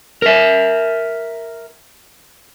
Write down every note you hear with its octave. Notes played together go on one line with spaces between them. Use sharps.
A#4 E5